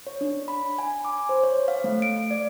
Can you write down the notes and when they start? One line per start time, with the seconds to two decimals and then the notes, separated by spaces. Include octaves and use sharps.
0.07 C#5
0.21 D4
0.48 B5
0.79 G#5
1.05 D6
1.29 C5
1.43 C#5
1.68 F5
1.84 A3
2.02 D7
2.31 D5